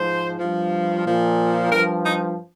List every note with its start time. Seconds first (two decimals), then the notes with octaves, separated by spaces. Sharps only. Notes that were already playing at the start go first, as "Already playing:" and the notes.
Already playing: G#2 F3 C5
0.38 G2 F3
1.04 A#2 F3
1.70 G2 F3 A#4
2.03 D#4